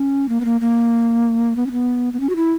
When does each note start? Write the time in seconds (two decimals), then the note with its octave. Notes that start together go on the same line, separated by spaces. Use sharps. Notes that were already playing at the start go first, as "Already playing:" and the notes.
Already playing: C#4
0.29 A#3
0.41 B3
0.45 A#3
0.61 A#3
1.56 B3
1.66 C#4
1.72 B3
2.13 B3
2.20 C#4
2.30 F#4
2.36 E4